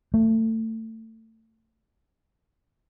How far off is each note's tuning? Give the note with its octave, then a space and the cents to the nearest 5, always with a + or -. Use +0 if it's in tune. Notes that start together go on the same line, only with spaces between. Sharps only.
A3 +25